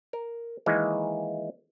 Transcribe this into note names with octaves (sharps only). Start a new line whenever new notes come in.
A#4
D#3 E3 G#3 A#3